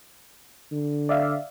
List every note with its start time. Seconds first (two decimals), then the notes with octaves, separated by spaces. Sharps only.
0.72 D3
1.09 D5 E5 F5